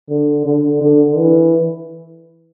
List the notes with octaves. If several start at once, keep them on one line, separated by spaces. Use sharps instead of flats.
D3
D3
D3
E3